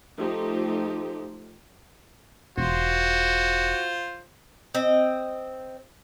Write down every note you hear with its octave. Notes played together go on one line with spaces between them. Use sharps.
F3 A3 D#4 G4 C5
E1 F4 F#4 C5
C4 D#5